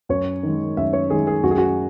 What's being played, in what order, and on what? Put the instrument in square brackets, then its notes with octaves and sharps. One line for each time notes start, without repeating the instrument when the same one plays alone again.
[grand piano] F#2 C#5
D#3 G#3
F#2 E5
C#5
D#3 G#3 G#4
G#4
F#2 F#4
G#4
F#4